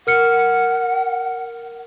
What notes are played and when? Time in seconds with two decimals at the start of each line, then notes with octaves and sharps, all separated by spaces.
0.07 A#4 F#5 F6 C#7